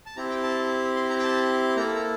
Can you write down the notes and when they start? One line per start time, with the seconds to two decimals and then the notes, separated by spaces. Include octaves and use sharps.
0.06 A5
0.16 C4 E4 G4 A#5
0.30 G5
0.43 A5
0.96 C6
1.10 A#5
1.19 G5
1.23 A5
1.76 A#3 E4 A4 A#5
1.96 A#5